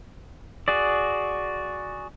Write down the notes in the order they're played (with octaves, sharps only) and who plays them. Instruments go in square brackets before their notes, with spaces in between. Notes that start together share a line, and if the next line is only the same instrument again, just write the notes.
[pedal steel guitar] F#4 G#4 D5